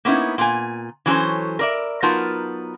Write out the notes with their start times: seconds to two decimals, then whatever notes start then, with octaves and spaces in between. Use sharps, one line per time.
0.05 A#3 B3 C#4 D#4 E4
0.38 A#2 G#5
1.06 E3 F#3 C#4 G#4 A4 C5
1.59 A#4 D5 E5
2.02 F#3 B3 D#4 F4 A#4 A5